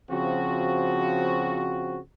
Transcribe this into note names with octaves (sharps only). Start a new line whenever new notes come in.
C#3 F3 C4 F#4